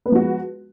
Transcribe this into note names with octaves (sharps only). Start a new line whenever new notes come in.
F3 G#3 B3 F#4 B4